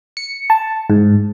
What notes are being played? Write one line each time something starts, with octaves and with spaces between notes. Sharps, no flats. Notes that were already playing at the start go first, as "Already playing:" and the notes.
C#7
A5
G#2